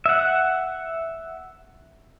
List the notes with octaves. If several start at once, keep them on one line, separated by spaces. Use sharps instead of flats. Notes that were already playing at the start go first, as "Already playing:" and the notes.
E5 F#5